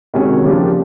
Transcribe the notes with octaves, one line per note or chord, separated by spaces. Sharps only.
C3 D#3 G#3 C#4 F#4
C#3 F3 A#3 D4 G4